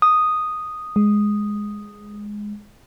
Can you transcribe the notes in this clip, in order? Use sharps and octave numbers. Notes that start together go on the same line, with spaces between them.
D#6
G#3